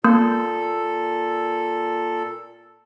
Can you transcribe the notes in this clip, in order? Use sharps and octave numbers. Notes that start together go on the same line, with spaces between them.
A#2 A#3 A4